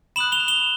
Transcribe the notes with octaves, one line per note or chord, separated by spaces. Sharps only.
B5 D#6 F#6 E7 F#7
F7 G7
F7 G7